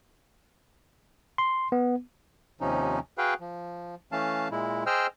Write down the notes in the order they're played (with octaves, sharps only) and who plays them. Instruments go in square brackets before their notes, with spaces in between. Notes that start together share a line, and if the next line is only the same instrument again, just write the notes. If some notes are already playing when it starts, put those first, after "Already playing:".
[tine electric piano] C6
B3
[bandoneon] D#2 C3 F3 C#4 D#4
F#4 G#4 B4 F5 G5
F3
E3 A3 C#4 F5 A5
A#2 G#3 E4
G#4 C5 D#5 G5 E6 F6